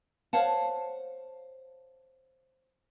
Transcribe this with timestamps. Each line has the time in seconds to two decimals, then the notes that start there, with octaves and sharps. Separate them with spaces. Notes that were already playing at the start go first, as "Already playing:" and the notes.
0.33 C5 C#5 F5 F#5 A5